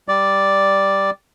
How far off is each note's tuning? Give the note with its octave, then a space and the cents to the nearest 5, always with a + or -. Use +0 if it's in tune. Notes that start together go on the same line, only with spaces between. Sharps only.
G3 +0 D5 +0